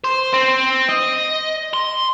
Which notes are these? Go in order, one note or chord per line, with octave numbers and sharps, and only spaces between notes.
C5
C4
D#5
C6